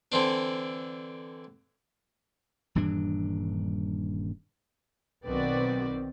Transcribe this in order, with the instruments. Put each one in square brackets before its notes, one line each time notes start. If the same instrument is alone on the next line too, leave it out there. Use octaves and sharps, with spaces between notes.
[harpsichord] D3 E3 C4 D4
[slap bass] D#1 G2 E3 D4
[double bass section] B1 D#3 C4 [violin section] F#4 B4 D5